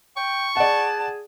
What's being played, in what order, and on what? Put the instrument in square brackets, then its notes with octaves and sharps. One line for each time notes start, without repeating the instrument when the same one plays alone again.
[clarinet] G5 [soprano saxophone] C#6
[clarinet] G#4 [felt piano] D5 F#5 [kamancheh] A5